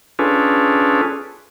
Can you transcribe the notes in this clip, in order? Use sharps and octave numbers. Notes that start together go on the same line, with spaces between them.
C#4 D4 F4 G#4 A4 B4